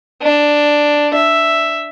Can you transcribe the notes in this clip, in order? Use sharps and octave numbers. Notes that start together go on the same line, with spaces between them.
D4
E5